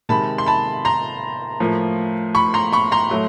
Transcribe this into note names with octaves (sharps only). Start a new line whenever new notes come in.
C3 D#3 G#3 A5 B5
C6
A5 B5
A#5 C6
A2 F3 A#3
B5 C#6
A#5 C6
B5 C#6
A#5 C6
A2 F#3 A3